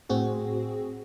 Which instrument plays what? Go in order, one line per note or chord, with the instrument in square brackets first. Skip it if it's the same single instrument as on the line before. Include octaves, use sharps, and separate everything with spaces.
[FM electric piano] A2 C4 F#4 G#4